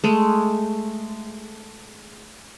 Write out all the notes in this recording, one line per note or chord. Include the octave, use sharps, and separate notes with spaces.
G#3 A3